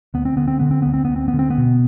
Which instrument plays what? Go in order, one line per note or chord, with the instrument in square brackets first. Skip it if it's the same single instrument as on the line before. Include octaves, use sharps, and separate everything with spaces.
[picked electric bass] D2 B3
C4
D3 B3
C4
D3 B3
C4
D2 B3
C4
B3
D2
C4
B3
D3
C4
B3
B2